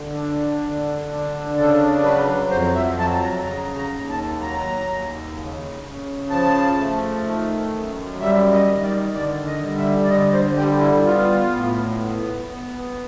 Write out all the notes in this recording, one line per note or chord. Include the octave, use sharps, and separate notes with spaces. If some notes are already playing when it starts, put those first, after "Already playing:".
Already playing: D3
D4
D3
D4
C#3 A4
F#3 B4
F2 C5
E5
F#3 A5
A#5
C#3 A#5
A#5
D#2
A5
F#3 A#5
D#2
C#3
C#3
F3 A5
A3
D#3
F#2
G3 E5
D#5
D#3
D5
D3 D5
D#5
G3
E5
D5
D3 D#5
C5
G3 G4
E4
B3 F4
A2
B3
B3